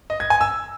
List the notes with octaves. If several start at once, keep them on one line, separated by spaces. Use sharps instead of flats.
D#5
G#6
G#5
E6